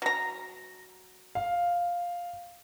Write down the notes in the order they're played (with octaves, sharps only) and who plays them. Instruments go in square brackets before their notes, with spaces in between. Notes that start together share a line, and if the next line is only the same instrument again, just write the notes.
[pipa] F#3 A#5
[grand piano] F5